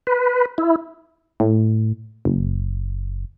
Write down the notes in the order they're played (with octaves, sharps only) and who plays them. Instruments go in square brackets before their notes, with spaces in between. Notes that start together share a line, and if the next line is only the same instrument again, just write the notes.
[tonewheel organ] B4
E4
[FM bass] A2
F#1